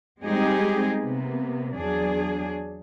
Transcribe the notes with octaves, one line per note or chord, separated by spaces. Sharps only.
G3 G#3 C4 D#4 G4 G#4
C3 A#3 B3
E2 F#3 D4 G#4